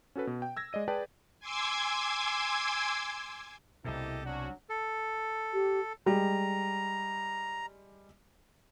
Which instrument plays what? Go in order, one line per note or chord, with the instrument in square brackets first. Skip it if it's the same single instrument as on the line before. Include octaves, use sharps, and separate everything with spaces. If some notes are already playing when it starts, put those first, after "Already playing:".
[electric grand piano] C#4 F#4 A4 B4
B2
G5
E6 G#6 A#6
G#3 D5 D#5 D#7
G#4 B4 D5 G5 A5
[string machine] G#5 C6 D6 E6 G#6
[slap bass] C2 B2 [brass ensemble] A#3 C4 E4 [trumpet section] G4 A4 D#5
[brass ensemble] F#3 D4 [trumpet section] C#4 F#4
[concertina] A4
[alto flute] G4
[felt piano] G3 G#3 [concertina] A#5